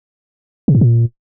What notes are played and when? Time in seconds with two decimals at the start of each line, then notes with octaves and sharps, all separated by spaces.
0.68 C3
0.75 G#2
0.81 A#2